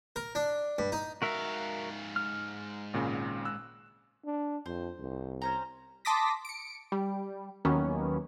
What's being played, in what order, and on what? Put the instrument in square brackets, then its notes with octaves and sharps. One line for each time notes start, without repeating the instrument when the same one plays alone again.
[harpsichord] A#4
D4
G2
D#4
[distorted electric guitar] G#2 F5 [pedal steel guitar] F#4 A#4 E5
[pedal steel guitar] F6
[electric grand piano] G#1 A#2 C#3
E6 F#6
[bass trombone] D4
[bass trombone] F2 [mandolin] C5
[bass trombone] C2
[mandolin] C#4 C5 A#5
[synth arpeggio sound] A5 C6 D6 D#6 A#6 B6
C#7 D7
G3
D#2 D#3 F#3 A#3 B3 C#4